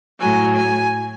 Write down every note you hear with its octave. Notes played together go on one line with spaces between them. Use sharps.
A2 F#3 G#5
G#5